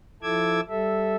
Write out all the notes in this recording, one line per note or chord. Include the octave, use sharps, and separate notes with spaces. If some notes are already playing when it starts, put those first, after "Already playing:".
F3 E4 A4 D6 E6 G#6
G3 A4 E5